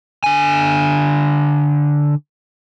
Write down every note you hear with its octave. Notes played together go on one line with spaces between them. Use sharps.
D3 G#5